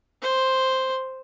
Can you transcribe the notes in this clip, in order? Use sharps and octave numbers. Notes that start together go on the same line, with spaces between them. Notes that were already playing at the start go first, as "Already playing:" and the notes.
C5